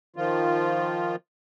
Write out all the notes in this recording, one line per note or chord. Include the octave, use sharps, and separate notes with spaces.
D#3 F3 F4